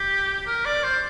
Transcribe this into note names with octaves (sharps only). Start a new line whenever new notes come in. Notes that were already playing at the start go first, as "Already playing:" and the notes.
Already playing: G4
A#4
D5
C5